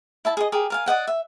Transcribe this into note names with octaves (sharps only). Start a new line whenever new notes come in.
E4 E5 A5
G#4 D#5
G4 G#4 A#4
A#4 F5 G#5
D5 D#5 F#5 G5
E5